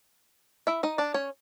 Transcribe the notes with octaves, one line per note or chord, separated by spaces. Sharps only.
E4 E5
D#4 D#5
D4 D5
C#4 C#5